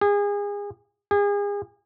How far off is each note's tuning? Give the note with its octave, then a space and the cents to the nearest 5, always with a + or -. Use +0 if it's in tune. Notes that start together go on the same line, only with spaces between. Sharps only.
G#4 -30
G#4 -35